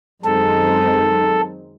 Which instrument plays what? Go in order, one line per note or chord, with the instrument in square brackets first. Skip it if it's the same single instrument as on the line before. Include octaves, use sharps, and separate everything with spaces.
[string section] F#2 D#3 G#3 C4 D#4 [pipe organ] A4